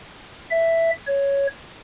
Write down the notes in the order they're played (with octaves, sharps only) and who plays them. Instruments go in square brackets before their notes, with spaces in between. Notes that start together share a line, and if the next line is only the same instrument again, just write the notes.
[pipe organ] E5
C#5